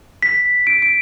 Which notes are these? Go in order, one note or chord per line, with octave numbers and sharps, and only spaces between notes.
B6
D7
D7